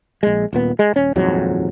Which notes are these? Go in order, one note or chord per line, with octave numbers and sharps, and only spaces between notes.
A#1 G#3
D#1 A#2 B3
G#3
D#1 C#4
D#1 F2 G#2 F#3